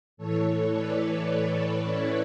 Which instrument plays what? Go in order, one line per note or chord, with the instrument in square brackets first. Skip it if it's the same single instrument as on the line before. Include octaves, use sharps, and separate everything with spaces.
[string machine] A2 E3 A4 C#5
B4 D5
B4 D5
C#4 E4